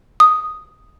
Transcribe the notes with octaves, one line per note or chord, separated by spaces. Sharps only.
D#6